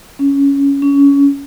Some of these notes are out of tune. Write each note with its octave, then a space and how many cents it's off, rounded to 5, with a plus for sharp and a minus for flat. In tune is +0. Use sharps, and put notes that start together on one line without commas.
C#4 +10
C#4 +20